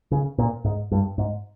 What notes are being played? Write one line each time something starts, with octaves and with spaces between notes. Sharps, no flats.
C#3
A#2
G#2
G2
G#2